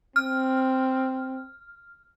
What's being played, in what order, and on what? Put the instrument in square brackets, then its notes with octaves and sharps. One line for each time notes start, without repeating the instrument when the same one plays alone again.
[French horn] C4 [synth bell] F6